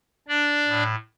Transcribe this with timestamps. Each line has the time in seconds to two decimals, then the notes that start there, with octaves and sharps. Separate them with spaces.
0.28 D4 D5
0.68 A2